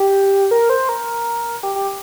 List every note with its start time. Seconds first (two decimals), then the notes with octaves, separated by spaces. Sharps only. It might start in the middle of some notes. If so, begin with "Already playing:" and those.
Already playing: G4
0.51 A#4
0.70 C5
0.89 A#4
1.63 G4
1.76 G4